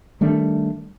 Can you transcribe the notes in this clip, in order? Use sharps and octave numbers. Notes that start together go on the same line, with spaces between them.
D#3 G3 A3 D4